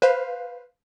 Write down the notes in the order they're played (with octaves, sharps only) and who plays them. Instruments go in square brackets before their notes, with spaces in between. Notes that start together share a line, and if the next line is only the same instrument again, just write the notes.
[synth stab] B4 C5 F5